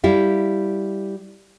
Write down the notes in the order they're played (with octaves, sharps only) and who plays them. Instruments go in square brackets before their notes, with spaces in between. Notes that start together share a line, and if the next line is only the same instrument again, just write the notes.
[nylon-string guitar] G3 E4 G4 F5